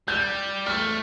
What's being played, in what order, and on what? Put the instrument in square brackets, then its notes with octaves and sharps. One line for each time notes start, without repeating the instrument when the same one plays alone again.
[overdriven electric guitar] G3 [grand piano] G6
[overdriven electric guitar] A3 [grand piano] F6